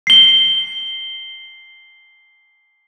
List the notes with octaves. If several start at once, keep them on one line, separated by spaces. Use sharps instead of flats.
C7 G7